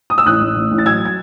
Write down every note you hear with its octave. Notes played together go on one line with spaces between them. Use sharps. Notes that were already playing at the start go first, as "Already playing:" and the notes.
D#6
E6
A1 D#6 F#6
A1
A1
A1
A6
F#3 E6 G#6
G#6